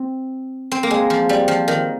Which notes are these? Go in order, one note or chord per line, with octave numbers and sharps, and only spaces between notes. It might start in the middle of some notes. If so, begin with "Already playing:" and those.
Already playing: C4
C4
A#3
G#3
F3
G3
F3
D#3